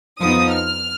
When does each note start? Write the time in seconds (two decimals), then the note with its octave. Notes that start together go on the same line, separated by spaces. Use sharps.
0.21 F2 F3 B3 D#4 D#6
0.53 F6